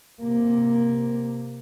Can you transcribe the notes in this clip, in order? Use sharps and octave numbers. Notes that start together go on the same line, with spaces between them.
C3 A#3